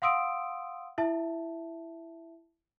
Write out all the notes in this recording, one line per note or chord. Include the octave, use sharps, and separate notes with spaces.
F5 F#5 C6 D#6 E6 D7
E4 E5 A5